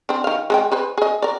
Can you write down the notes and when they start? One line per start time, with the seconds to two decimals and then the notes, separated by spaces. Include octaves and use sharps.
0.09 C4 D4
0.24 D#3 F5
0.50 G#3 G#4 G5
0.72 G#4 B4 C5
0.98 G#4 D#5
1.22 A#4 D5